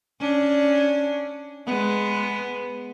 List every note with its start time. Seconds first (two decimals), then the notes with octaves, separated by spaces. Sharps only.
0.20 C#4 D4
1.66 G#3 B3